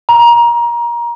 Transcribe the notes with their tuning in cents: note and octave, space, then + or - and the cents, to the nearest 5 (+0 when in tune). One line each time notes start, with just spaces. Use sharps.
A#5 +25